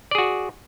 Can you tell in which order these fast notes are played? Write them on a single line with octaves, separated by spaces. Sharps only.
D5 G#4 F#4